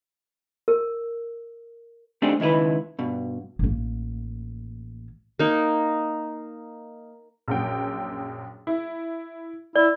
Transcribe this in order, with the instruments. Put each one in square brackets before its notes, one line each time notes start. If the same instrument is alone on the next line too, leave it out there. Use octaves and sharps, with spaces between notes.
[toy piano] A#4
[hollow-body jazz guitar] A3 C4 D4 D#4 G4 G#4
C#2 D#3 E4 B4
G2 B2
[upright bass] A1 A#3
[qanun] A#3 D#4
[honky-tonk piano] A#1 F#2 G5
E4
[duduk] E4 [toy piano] D5